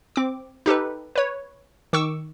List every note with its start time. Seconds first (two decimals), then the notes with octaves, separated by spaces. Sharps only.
0.16 C4 D6
0.66 D#4 G4 A4 B4
1.16 B4 C#5
1.93 D#3 C#6 D6 E6